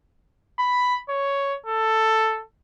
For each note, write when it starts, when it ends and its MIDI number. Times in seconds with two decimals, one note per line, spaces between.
0.59 0.97 83
1.09 1.56 73
1.66 2.42 69